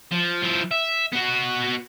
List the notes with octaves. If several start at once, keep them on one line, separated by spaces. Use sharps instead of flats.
F3
F3 E4
E5
B3 F#4